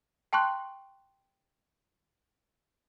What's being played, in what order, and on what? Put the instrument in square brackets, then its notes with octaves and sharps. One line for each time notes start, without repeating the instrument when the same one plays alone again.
[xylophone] G5 A5 C6 C#6 F#6